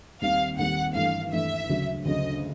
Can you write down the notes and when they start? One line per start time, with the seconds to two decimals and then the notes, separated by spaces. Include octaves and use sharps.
0.21 D#2 D#3 G3 C4 F5
0.58 D#2 D#3 G3 C4 F#5
0.95 G2 E3 A3 F5
1.32 G2 E3 A3 E5
1.69 D2 C#3 F#3
2.05 D2 C#3 F#3 D#5